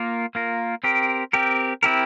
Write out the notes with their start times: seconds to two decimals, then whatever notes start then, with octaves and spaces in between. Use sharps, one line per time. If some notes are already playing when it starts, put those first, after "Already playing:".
Already playing: A#3 F4 A#4
0.35 A#3 F4 A#4
0.84 C4 G4 A#4
1.33 C4 G4 A#4
1.83 C4 E4 G4 A#4